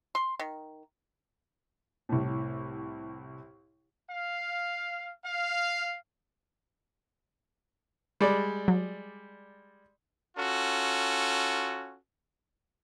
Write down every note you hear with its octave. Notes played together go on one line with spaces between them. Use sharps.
C6
D#3
C2 A2
F5
F5
G3 G#3 D5
F#3
C#4 F4 F#4 A4